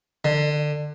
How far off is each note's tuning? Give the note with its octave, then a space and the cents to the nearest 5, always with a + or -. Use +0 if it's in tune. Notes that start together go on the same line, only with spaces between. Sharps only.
D3 +25